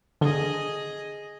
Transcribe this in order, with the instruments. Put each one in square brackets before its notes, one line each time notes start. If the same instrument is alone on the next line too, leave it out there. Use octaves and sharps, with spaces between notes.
[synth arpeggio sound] D3 [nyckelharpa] G#4 D#5